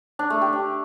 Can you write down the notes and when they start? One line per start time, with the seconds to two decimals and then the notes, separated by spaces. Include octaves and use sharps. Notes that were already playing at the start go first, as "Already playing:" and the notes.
0.19 D4
0.30 A3
0.42 G4
0.53 D4